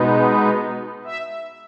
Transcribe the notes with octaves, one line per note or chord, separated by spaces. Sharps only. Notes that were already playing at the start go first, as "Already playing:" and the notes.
Already playing: B2 G#3 B3 D#4
E5